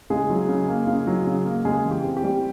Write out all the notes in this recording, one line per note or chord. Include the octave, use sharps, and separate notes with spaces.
C#3 G#3 G#4
F#3
C#3
A#3
C#3
F#3
C#3
A#3
C#3 G#3 G#4
E3
G4
C4
G4
G3